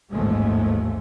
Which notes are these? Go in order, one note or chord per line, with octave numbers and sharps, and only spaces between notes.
A1 D#2 G#2 F3 G#3 A3